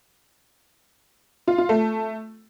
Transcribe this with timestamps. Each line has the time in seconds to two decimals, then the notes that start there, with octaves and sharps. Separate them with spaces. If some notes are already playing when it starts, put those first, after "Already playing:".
1.48 F4
1.58 F4
1.69 A3